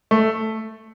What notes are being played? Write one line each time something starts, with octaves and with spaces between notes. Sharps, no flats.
A3